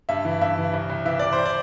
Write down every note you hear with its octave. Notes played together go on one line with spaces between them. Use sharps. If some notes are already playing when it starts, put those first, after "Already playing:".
G2 E5
E3
G2 E5
E3
C2
C2
E3 E5
C3 D5
C5
D5